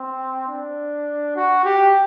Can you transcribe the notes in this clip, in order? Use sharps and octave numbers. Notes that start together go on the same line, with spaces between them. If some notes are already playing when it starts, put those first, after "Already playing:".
Already playing: C4
D4
F#4
G4